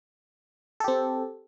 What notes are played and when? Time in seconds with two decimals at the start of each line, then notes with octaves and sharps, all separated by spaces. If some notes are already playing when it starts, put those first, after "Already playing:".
0.80 A4
0.84 G4
0.88 C4